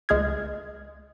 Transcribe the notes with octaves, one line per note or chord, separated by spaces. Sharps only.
C#2 G#3 G#4 F6 G#6